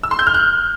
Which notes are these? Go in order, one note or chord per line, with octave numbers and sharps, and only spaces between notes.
E6
C6
G6
F6
F#6